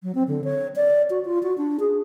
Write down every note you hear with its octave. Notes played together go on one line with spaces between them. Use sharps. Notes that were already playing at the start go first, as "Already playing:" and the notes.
F#3
C4
D3
C#5
D5
F#4
F4
F#4
D4
G#4